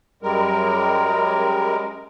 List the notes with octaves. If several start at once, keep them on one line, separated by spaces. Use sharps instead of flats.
F#2 G3 G#3 A#4